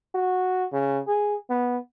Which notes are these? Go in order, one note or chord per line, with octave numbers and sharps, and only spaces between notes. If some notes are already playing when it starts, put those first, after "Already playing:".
F#4
C#3
G#4
B3